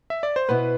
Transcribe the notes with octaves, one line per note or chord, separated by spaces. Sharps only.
E5
D5
C5
B2 B3 E4 B4